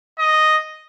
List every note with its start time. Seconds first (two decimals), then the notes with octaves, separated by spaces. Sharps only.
0.19 D#5